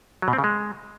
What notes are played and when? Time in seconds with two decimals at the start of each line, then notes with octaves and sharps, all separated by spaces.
0.22 F#3
0.28 B2
0.33 C4
0.38 C#3
0.44 G#3